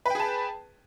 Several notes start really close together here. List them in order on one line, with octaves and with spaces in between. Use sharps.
B4 G5 G#4 A5